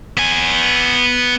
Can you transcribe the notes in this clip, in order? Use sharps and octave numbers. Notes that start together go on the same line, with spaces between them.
B3 G#5